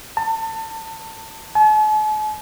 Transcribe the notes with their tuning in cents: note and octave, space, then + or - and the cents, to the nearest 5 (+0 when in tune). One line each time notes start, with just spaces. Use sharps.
A5 +30
A5 -45